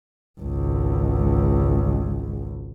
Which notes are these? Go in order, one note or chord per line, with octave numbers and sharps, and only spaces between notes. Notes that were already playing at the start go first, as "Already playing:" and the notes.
G#1 C#2